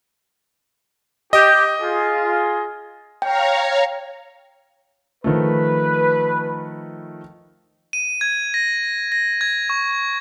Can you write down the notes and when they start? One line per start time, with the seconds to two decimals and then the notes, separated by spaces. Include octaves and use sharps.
1.33 G4 D#5
1.82 F4 G#4
3.22 C#5 F5 G5 A#5
5.24 D#3 F3 A3 B4
7.93 D#7
8.21 G#6
8.54 A#6
9.12 A#6
9.41 G#6
9.70 C#6